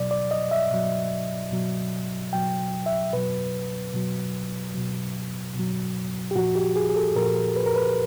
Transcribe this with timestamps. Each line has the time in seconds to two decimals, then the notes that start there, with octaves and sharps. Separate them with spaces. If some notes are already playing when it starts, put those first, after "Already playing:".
Already playing: B2 F#3 D5
0.11 D5
0.31 D#5
0.51 E5
0.71 B2 F#3
1.52 B2 F#3
2.33 B2 F#3 G5
2.86 E5
3.13 B2 F#3 B4
3.94 B2 F#3
4.74 B2 F#3
5.55 B2 F#3
6.31 G4
6.35 A#2 F3 F#4
6.56 G4
6.76 G#4
6.89 G#4
6.96 A4
7.16 A#2 F3 A#4
7.56 B4
7.66 A#4
7.76 B4